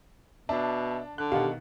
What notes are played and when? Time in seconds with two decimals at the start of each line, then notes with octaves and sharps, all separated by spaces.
0.49 B2 D4 E5 A5
1.18 D3 F#6
1.32 B2 D#3 G4 F5 F#5